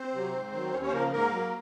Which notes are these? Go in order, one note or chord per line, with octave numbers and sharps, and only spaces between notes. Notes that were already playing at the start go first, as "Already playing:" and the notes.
Already playing: C4 C5
C3 F#3
G#2
D#3 F#3
D#2 C#4 C#5
C#4 C#5
C5
C#3 F3 A#3 A#4
G#2 A#3 A#4
F#3